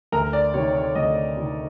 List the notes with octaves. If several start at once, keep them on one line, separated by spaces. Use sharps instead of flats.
D2 A#4
D5
C3 D#3 C#5
C#5
D2 D#5
C3 D#3